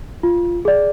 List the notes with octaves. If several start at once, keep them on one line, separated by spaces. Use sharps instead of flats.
F4
G#4 D5